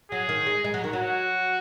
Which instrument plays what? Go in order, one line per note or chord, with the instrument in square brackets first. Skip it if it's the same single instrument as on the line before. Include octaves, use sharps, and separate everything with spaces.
[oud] F#3 [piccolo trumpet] G#4
[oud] D#3
G#3
G#3
F#3
[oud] D#3 [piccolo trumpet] F#4
[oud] F#3